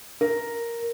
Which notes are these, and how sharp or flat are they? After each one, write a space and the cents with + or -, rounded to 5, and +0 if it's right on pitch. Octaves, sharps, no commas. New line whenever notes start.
A#4 +0